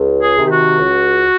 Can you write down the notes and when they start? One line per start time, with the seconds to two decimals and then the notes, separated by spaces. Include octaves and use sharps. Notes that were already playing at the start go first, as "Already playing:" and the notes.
Already playing: C#2
0.22 G#4
0.37 C3 D#3
0.47 G4
0.51 F#4
0.80 C#2